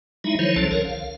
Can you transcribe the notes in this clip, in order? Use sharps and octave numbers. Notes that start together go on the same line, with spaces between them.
F#3 G#3 D#4 E4 E5
D#3 F3 F#3 E4 C5 C#5
C2 D3 F3 C#4 A4 A5
C2 A#4 C#5
F5